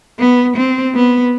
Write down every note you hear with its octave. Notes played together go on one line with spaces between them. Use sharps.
B3
C4
B3